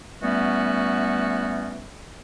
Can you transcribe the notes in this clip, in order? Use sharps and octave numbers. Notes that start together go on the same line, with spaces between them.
E3 G3 A3 B3 C#4 F#4